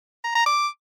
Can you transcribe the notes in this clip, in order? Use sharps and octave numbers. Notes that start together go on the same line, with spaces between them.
A#5
A#5
D6